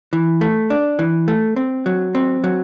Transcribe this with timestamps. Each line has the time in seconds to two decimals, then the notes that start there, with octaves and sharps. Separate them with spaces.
0.13 E3
0.41 A3
0.70 D4
0.99 E3
1.28 A3
1.56 C4
1.86 F#3
2.15 C4
2.44 F#3